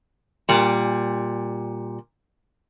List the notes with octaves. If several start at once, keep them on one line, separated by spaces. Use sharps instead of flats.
A#2 G3